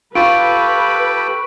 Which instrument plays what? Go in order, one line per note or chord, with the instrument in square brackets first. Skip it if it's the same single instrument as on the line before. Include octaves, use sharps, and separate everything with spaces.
[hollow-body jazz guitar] F4 [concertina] G4 A4 B5 [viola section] B4 [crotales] C#6 D7